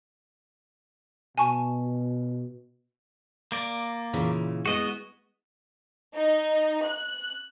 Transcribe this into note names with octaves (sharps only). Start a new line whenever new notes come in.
B2 G#5 A5 C#6
A#3 D5
A#2 C#3 E3
G#3 B3 F#4 D#5
D#4
F#6